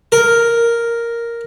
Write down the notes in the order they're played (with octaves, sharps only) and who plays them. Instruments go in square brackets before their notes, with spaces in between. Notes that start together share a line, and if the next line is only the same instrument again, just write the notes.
[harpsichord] A#4